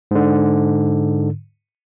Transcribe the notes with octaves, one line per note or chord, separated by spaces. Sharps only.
G#2 D3